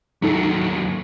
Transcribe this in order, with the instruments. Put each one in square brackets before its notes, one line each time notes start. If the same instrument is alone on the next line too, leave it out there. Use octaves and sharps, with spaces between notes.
[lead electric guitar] D#2 F#3 [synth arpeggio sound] G#3 D#4 A4